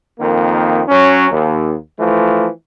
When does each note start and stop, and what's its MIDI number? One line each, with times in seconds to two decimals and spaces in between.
0.20 0.82 41
0.20 0.82 51
0.20 0.82 58
0.88 1.28 54
0.88 1.28 61
1.31 1.74 39
1.99 2.48 52
1.99 2.48 53
1.99 2.48 57